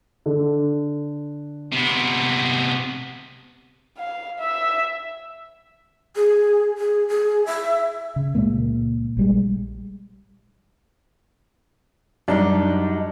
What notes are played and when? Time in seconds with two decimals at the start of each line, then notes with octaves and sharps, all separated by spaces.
0.26 D3
1.72 C3 B3
3.98 F5
4.40 E5
6.16 G#4
6.78 G#4
7.08 G#4
7.46 E5
8.16 C#3
8.35 C#2 A#2 G#3 A#3
9.17 A#1 G3 G#3
12.28 F#2 G3 D4 D#4